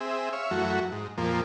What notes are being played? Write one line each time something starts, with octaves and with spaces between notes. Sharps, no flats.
C4 G#4 E5
C#5 E5 F5
F#2 E3 F#3 A3 F#4
G#2
F2 A#2 F3 A#3